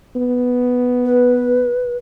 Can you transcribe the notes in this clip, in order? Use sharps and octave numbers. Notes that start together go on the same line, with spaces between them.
B3
B4